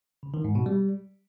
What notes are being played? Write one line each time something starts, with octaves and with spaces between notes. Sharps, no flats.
C#3
D#3
G#2
B2
G3